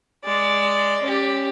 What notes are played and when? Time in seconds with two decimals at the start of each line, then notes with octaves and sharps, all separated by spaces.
0.24 G#3 D5
1.02 C#4 G4